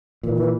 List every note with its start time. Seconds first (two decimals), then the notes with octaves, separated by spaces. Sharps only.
0.23 A#2 E3
0.35 D#3
0.38 E3